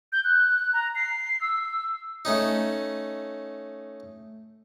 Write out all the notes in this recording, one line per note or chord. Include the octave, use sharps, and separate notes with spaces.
G6
F#6
A#5
C7
E6
A3 C#4 D#4